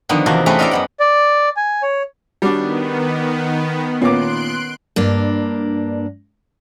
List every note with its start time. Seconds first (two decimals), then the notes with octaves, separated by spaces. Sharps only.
0.09 D3 D#3 F3 B3 D#4
0.26 E2 C3 A#3 F4 F#4 A5
0.46 A3 C4 C#4 F4 G#4 B4
0.59 D#4 F4 A#4 D5 E5 F5
0.71 F#2 B3 F#5
1.00 D5
1.57 G#5
1.83 C#5
2.42 D#3 G3 B3 D4 F#4
4.02 A#2 B3 C#4 C6 D6 F#6 D7
4.96 G2 A#3 D4